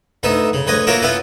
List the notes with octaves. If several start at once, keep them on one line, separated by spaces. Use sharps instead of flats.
D2 B3 D#4 E5
C#3
D2 B4 C#5 D#5 G#5
A#3 F4 F#4 A#4 C#5 E5
B3 C#4 E4 F4 B4